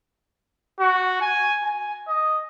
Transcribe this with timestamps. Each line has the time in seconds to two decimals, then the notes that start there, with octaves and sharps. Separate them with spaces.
0.80 F#4
1.21 G#5
1.65 G#5
2.08 D#5